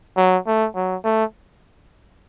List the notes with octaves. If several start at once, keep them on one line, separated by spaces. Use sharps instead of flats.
F#3
A3
F#3
A3